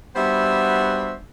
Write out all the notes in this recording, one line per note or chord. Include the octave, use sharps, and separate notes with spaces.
G3 B3 D4 F#4 C5 E5